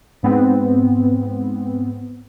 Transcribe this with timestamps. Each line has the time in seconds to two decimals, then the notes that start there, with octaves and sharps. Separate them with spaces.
0.23 G#2 B3 C4